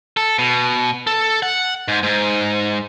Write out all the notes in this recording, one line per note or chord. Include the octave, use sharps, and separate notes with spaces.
A4
B2
A4
F#5
G#2
G#2